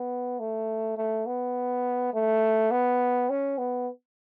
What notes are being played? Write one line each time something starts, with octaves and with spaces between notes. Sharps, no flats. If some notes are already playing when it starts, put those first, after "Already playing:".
Already playing: B3
A3
A3
B3
A3
B3
C#4
B3